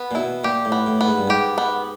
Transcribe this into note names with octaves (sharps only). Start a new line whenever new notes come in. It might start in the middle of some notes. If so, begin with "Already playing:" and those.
Already playing: B3
A#2
B2 E4
A#2 G4
A2
B3
A2
B3
G#2
G2
G#2 G4
B3